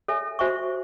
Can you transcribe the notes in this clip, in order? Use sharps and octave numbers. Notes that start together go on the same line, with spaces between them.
A4 C#5 E5 G#5
F#4 C5 E5 G#5 C#6